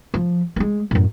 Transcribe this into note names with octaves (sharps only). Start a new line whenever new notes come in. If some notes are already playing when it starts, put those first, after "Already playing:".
F3
G#3 A#3
F#2 A2